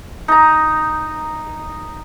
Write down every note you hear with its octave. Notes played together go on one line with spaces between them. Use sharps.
D#4 A#5